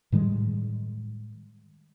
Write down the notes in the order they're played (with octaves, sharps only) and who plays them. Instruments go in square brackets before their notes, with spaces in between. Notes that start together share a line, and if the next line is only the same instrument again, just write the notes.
[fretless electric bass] A2 D#3 G3 G#3